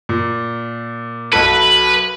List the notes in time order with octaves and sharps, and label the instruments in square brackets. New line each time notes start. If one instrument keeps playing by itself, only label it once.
[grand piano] A#2
[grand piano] B1 F#4 A4 [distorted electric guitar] B4